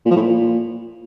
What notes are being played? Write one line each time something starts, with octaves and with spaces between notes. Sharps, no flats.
A#2
F3
A2
A#2